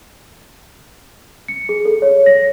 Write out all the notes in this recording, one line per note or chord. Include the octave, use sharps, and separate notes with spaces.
C#7
G#4
A4
C#5
A#6